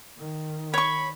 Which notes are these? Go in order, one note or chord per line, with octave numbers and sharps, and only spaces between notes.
D#3
C#5 B5 C#6